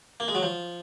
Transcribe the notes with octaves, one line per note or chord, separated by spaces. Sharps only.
A#3
G#3
F#3
F3